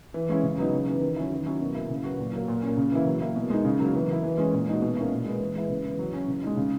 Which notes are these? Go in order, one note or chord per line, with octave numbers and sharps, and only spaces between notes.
E3
G#3 C#4 E4
C#3
F#3 B3 D#4
C#3
E3 B3
D#3
F#3 C#4 E4
D#3
F#3 C#4 E4
B2
A#3 E4
C#3
F#3 B3 F#4
A#2
F#3 A#3
A#2
A#3 C#4
C#3
E3 A#3 E4
F#3
A#3 E4
B2
G#3 D#4
C#3
F#3 A#3
E3
B3 E4
E3
G#3 C#4
A#2
G#3 D#4 F#4
B2
A#3 C#4 E4
A#2
G#3 B3
E3
G#3 B3 E4
C#3
E3 B3
F#3
C#4 E4
C#3
G#3 D#4
C#3